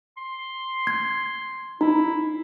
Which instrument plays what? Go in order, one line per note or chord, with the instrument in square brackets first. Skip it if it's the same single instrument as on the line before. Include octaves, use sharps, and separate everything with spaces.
[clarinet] C6
[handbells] G#6
[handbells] D#4 [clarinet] E4